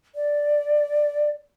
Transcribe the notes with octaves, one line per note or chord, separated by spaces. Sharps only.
D5